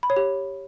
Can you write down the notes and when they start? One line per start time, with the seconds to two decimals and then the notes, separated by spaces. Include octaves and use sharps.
0.03 B5
0.10 C#5
0.16 G4